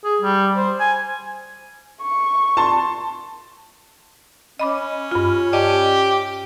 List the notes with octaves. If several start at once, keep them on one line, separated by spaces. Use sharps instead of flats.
G#4
G3
C5
G#5
C#6
A5 C6
C#4 D#5 B5 D6
G2 F4
G4 D5 D#5 A5